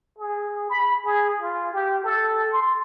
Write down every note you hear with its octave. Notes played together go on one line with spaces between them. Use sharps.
G#4
B5
G#4
F4
G4
A4
C6